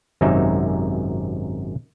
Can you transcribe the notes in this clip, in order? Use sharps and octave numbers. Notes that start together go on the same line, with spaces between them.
G#1 F#2 C3 C#4 D#4 E5